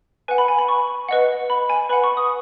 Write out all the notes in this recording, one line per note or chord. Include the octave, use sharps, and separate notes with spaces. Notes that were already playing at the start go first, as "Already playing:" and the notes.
B4 F#5 G#5
B5
G#5
B5
C#6
B4 D#5 F#5
B5
G#5
B4 F#5 B5
C#6
D#6